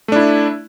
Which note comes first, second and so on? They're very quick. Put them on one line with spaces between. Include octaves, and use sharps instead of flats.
A3 D4 E4